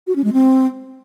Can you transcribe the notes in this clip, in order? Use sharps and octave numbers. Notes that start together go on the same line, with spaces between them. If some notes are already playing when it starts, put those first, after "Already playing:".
F#4
C#4
G#3
C4